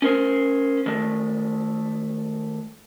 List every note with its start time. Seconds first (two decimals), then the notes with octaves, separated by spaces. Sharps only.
0.02 C#4 A#4 C5
0.86 D#3 G#3 A3